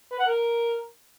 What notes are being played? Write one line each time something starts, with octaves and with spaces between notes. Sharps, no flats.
B4
F#5
A#4